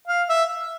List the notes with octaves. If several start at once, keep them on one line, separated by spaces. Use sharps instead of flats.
F5
E5